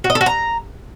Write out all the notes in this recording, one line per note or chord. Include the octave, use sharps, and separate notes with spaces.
F#4
D#5
A4
F#4
A#5